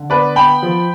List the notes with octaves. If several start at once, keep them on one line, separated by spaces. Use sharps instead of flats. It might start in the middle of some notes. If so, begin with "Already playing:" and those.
Already playing: D3
B3 B4 D5
B3 G5 B5
F3